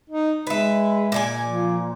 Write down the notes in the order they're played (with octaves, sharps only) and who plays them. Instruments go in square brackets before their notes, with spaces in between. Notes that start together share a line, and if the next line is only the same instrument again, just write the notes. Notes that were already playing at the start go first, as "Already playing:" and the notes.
[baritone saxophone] D#4
[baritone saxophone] G#3 [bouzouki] B4 E5
[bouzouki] A#2 D5 G#5
[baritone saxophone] F3